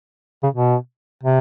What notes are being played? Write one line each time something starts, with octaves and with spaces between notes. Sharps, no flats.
C#3
B2
C3